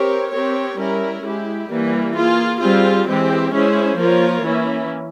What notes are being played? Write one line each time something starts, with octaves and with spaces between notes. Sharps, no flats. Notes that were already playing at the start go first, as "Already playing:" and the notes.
Already playing: C4 G4 A#4 C#5
C4 G4 A#4 C#5
G3 C#4 E4 A#4
G#3 E4 G4
E3 G3 A#3
A#3 F4 G#4
G3 C4 F4 G#4
E3 G#3 C4 G4
G#3 C#4 E4 G#4 C5
F3 A#3 F4 A#4 C#5
E3 A#3 C#4 E4